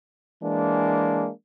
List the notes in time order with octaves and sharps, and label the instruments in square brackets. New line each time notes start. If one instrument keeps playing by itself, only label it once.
[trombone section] E3 G#3 A#3 D4